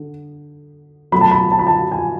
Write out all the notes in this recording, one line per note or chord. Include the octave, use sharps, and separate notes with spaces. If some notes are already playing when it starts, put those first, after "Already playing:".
Already playing: D3
B2 F#3 A3 B5
A5
B5
A5
B5
A5
G#5